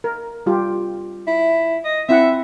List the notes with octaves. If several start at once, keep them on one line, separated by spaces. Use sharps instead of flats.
A#4
G3 F4 G4
E4
D#5
C4 E4 E5 F#5